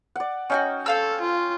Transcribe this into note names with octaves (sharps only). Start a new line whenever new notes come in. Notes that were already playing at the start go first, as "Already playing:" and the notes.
D5 F#5
C#4 D#4 E4 F#4 G5
A4 C5 F5 E6
F4